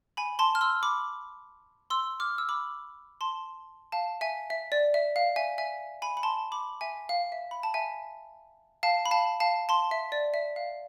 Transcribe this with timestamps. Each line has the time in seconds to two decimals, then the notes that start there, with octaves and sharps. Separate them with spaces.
0.17 G#5 B5
0.39 A5 C6
0.55 F6
0.61 C6 E6
0.83 B5 D6
1.90 C6 E6
2.20 D6 F6
2.38 E6
2.49 B5 D6
3.21 A5 C6
3.92 F5 A5
4.21 E5 G#5
4.50 E5
4.72 D5
4.94 E5
5.16 F5
5.36 E5 G#5
5.58 E5 G#5
6.02 G#5 B5
6.17 B5
6.23 A5 C6
6.52 B5 D6
6.81 E5 G#5
7.09 F5
7.32 E5
7.51 B5
7.63 A5
7.74 E5 G#5
8.83 F5 A5
9.06 B5
9.11 F5 A5
9.40 F5 A5
9.69 A5 C6
9.91 E5
10.12 D5
10.34 E5
10.56 F5